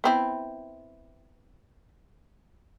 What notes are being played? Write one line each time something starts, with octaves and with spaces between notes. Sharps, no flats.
B3 C4 E4